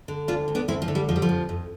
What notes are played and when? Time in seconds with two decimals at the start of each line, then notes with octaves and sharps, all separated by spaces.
0.08 D3
0.28 D2 D4 F4
0.48 D2
0.55 B3 D4
0.68 D2 C4 E4
0.82 F3
0.88 D3
0.95 G3
1.09 F2 F3
1.16 G3
1.22 F3
1.29 F2
1.49 F2